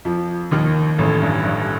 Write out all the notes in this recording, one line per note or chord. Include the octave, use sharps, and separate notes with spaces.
F2 F3
D#2 D#3
A1 A2
G2
G2